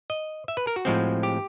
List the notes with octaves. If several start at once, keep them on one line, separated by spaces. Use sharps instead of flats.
D#5
E5
B4
A#4
F#4
A2 F3 G#3 C4
G4